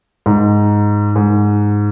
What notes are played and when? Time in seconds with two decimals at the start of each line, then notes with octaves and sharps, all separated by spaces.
0.26 G#2
1.16 G#2